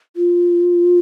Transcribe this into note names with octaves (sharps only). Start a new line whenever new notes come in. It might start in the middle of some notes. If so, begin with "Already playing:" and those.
F4